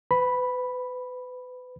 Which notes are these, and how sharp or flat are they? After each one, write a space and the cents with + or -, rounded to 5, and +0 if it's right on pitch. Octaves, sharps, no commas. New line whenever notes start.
B4 +30 B5 +0